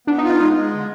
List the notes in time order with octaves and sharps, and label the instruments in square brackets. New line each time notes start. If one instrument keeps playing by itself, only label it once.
[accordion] B3 [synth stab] D4
[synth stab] D#4
[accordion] F4
[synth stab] D#4
[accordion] G#3 [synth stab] D#4
[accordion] G#3
D3